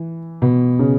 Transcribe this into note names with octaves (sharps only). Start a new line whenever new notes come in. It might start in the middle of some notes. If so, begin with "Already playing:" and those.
Already playing: E3
B2
C#3